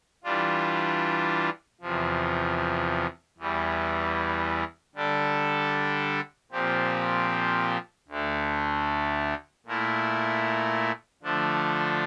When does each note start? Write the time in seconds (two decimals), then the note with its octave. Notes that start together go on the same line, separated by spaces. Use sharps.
0.24 E3 G3 D4 F4
1.81 E2 C3 F3
3.38 E2 E3 G3
4.95 D3 G3 D4 A4
6.51 A#2 F3 C4 G4
8.08 D2 D3 A3
9.66 A#2 A3 E4 A#4
11.23 D3 F3 A3 D4